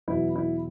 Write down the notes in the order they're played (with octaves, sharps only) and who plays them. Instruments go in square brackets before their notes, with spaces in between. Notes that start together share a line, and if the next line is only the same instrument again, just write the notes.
[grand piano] E2 B2 F#3 E4
E4